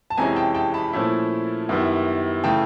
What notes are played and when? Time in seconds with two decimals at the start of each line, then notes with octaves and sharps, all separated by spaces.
0.10 A5
0.17 F2 C3 E3 G#3 C#4 G#5 A#5
0.36 G5 A5
0.55 G5 A5
0.74 A5 B5
0.93 A#2 F3 A3 C#4 E4
1.69 F#2 D#3 G3 B3 E4
2.44 C#3 E3 A3 G5 A5